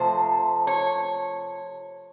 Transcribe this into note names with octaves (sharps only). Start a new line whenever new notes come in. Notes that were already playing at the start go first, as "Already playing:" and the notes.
Already playing: C3 F3 A3 C5
C#5